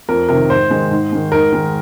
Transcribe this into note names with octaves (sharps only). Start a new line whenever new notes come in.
F2 A#4
C3 D#3 A#4
G#2 C5
D#3 G#3
G#2
D#3 G#3
G#2 A#4
D#3 G#3